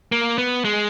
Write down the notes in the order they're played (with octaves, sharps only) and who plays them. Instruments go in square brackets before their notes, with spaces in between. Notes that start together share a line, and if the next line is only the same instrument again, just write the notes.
[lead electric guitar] A#3
B3
G#3